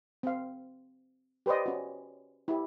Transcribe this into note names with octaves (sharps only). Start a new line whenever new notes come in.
C4 F5
G4 B4 C5 D5 D#5
C#4 F#4
E4 G4